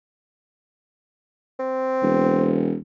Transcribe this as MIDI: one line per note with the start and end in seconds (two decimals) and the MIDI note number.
1.60 2.67 60
2.03 2.76 28